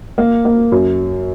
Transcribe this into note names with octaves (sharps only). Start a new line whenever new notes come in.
A#3
A#3
F#2